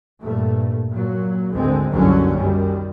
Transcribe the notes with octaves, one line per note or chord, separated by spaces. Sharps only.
G2 A#2 A3
A#2 F#3
G#1 D2 D3 G#3 C4
F#1 C2 F#2 D3 F#3 C#4
F#2 D#3 G3